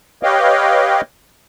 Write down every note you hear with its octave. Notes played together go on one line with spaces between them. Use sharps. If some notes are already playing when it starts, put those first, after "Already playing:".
G4 B4 C#5 D#5 F5 G5